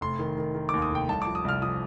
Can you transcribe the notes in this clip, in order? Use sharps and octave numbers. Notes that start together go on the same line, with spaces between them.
F1 C6
D#3
D#3
D#3
D6
D#2
D#6
F1 G5
C2 A5
D6
F3
D#6
C2 F6
F3 D#6